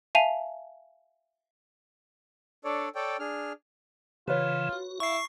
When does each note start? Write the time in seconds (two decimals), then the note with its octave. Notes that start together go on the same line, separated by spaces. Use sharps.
0.15 E5 F5 G#5 A5 D#7 F7
2.64 D4 A4 C#5 D5
2.95 A4 C#5 D5 G5
3.19 D4 G#4 F6
4.28 C#3 E3 F4 B4 C#5
4.73 F#4
5.00 E4 F5 C#6 C7